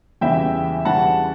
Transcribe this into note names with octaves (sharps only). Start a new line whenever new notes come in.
E2 C#3 E3 G3 C#4 E5 G5
E2 C#3 E3 G3 C#4 F#5 A5